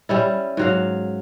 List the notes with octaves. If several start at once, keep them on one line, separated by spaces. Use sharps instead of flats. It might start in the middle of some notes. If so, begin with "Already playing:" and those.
G3 C#4 E4
G#2 F#3 F5